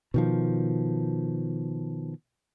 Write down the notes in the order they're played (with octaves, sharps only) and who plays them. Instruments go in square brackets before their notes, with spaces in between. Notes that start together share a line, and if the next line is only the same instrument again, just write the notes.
[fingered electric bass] B2 D#3 F3